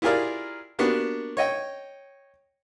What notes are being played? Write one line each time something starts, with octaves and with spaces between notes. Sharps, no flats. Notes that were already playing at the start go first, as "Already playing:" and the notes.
E4 F4 G4 G#4 A#4 D5
A#3 B3 D4 F#4 G4
C#5 D#5 G5